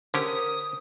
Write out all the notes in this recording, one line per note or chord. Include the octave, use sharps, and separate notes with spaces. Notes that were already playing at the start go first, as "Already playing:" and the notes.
D3 C#4 G4 A#4 C5 D#6